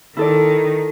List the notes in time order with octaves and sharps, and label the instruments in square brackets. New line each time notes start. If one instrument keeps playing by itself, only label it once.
[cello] D#3 [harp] E4 A4 D5